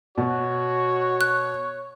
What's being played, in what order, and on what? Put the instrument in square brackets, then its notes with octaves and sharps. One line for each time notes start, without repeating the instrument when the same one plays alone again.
[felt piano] B2 [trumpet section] F#4 [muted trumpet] C#5
[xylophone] F#6